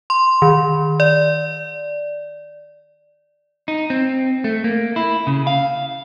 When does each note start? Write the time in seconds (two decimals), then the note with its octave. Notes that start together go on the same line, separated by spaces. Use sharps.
0.10 C6
0.42 D#3
1.00 D5
3.68 D#4
3.90 C4
4.44 A3
4.64 A#3
4.96 E4
5.27 C#3
5.47 F5